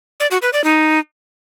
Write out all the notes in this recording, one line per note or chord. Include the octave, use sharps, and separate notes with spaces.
D5
F#4
B4
D5
D#4